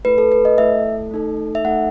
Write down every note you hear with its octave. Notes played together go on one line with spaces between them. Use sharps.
A3 E4 A4 B4
A4
B4
D#5
A3 E4 A4 E5
A3 D#4 A4
E5
A3 D#4 A4 F#5